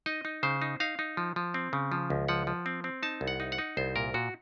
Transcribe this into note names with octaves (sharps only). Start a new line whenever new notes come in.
D#4 D#5
D#4
C#3 C5
D#4
D#4 F5
D#4
F3
F3
C4
C#3
F3
C#2
F3 F#5
F3
C4
C4
D#4 A5
C2
F#5
D#4
F#5
D#4
C2 C5
A#2 A#4
A#2 F#4